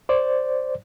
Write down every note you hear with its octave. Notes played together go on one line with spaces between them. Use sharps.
C5 D5